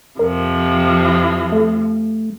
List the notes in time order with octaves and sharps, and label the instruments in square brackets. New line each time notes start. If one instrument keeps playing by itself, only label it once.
[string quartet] F2 C3 F3 [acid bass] A#4
[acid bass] A3